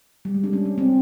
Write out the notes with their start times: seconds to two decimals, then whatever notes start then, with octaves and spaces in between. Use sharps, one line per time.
0.25 G3
0.34 G#3
0.44 D4
0.53 C#4
0.65 C#4
0.78 C4